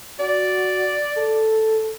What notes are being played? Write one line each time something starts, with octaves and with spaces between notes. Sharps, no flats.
F#4 D5
A4